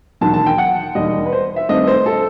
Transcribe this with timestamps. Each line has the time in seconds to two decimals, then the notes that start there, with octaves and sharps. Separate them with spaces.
0.21 E1 D#2 D#3 F#3 A5
0.34 A5
0.46 G5
0.58 F#5
0.95 E1 D#2 D#3 G3 D#5
1.26 B4
1.32 C5
1.56 E5
1.69 G2 D#3 A3 C4 D#5
1.87 C5
2.06 A4